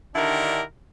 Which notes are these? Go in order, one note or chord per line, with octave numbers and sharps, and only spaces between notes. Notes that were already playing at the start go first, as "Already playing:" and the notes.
D3 D#3 D4 E4 G4 A#4